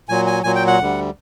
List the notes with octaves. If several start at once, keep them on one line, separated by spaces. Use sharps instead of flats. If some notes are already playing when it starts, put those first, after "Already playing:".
A#2 F#3 G#5
G#5
A#2 F#3 G#5
G5
F#5
D2 D3 G3